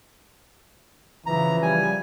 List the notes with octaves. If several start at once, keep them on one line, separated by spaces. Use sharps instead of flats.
C#3 E3 F3 A#5
G3 G#5